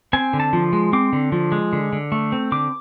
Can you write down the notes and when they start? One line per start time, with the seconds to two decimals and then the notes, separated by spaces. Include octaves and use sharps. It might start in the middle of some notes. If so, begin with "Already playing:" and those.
0.13 C4 G#5
0.33 D3
0.40 A5
0.53 F3
0.73 G#3
0.93 C4 D6
1.13 D3
1.32 F3
1.52 G#3
1.73 D3
1.93 D3
2.12 A3
2.32 C4
2.52 D3 D6